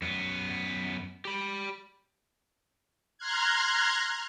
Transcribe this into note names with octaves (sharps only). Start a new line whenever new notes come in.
F#2 B3
G4 B5
A#5 C6 F6 F#6 G#6